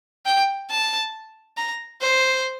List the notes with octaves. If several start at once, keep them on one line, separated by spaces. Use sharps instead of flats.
G5
A5
A#5
C5